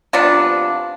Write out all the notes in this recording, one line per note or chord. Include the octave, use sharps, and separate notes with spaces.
C3 F3 B3 D4